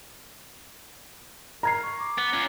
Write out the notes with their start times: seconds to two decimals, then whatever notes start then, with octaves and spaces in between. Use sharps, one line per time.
1.63 A#4 A#5 G#6 C7
1.83 C#6
2.00 D6
2.18 B3
2.33 C#4 F4